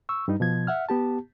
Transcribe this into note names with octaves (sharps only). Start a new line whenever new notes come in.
C#6 E6
G2 G3 D#4
B2 F3 G#6
E5 F#5 F6
B3 G4 A5